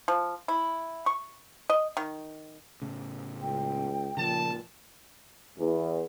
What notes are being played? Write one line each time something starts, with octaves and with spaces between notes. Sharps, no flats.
F3
E4
C#6
D#5
D#3
A2 C#3
C#2 G5
A#2 C#3 F3 A5
E2